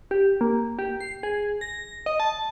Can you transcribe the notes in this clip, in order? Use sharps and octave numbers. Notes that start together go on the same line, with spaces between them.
G4
A#3
G4
C7
G#4
A#6
D#5
A5